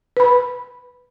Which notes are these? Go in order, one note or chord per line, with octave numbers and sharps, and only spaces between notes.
B4 B5